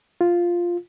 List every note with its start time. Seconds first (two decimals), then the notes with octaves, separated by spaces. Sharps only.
0.21 F4